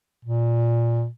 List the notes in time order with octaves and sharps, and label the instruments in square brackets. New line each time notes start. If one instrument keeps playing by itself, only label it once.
[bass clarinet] A#2